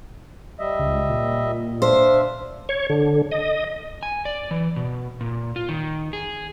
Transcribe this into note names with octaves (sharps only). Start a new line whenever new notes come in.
G3 D#5 E5
C#2
A#2
D4 C5 E5 F5
C#5
D3
D#5
G#5
D5
E3
B2
A#2
F4
D#3
G#4